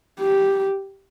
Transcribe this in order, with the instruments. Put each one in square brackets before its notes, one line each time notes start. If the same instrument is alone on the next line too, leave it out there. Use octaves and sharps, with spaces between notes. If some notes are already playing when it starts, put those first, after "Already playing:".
[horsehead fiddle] G4